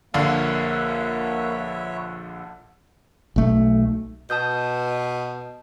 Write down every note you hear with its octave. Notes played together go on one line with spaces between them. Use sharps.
A#1 D3 A#3 B4 C#5 E5 F5
B1 A3
B2 A5 D#6 G6